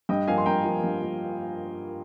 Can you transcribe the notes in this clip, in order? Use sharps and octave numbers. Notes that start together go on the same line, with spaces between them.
G2 D#5 G5
F3 A#3 F5 G#5
C6
G2 G5 A#5
F3 A#3
G2
F3